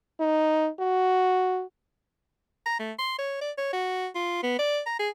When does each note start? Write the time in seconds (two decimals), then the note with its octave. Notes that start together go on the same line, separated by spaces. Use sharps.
0.20 D#4
0.80 F#4
2.66 A#5
2.79 A3
2.99 C6
3.18 C#5
3.41 D5
3.58 C#5
3.73 F#4
4.15 F4
4.43 B3
4.59 D5
4.86 A#5
4.99 G#4